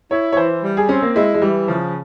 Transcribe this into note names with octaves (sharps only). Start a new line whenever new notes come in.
E4 C#5
C#5
E3 C5
G3
G#4
C4 C#4
A#3
G#3 E4
G#3
E3 G3
C#3 F3